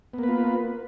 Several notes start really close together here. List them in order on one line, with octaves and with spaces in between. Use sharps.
B3 A#3 B4 F4